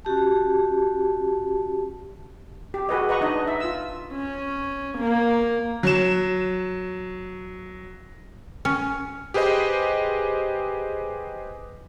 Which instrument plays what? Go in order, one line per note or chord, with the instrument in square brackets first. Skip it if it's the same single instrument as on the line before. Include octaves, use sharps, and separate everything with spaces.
[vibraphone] C#4 F#4 G4 A5
[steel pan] G4
F#4 G#4 B4 D#5
B4 D#5 F#5 A#5 C#6
D4 D#4 D#5
E5
F4 E6
[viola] C#4
A#3
[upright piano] F#3 E7
[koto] C#4
[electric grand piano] G4 G#4 B4 C5 D#5